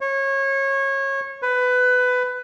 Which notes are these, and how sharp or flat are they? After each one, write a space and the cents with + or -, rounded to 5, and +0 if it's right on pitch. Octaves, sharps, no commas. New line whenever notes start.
C#5 -25
B4 +15